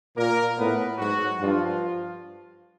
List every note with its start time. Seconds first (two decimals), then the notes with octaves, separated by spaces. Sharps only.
0.17 A#2 A#3 A#4
0.58 A2 B3 B4
0.98 G#2 F#3 F#4
1.39 G2 F3 F4